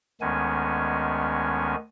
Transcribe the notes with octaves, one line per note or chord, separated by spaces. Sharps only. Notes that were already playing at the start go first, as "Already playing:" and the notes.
D2 D#3 G#3 B3 C#4 G#5